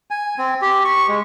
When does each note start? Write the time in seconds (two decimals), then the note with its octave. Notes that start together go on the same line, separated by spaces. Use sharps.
0.11 G#5
0.38 C4
0.62 G4
0.85 C#6
1.08 G#3